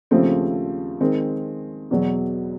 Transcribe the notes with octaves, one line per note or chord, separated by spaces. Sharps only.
D#2 C#3 F3 A3 C4
D#3 G#3 C4
E2 B2 F#3